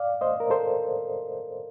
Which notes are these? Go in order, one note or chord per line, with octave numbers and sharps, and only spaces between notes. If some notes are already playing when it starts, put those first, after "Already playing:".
Already playing: D5 F5
C5 D#5
A#4
A4 C5